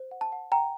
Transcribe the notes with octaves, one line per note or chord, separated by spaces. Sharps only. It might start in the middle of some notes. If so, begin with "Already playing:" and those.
Already playing: C5
F#5
A5
F#5
F#5 G5 A#5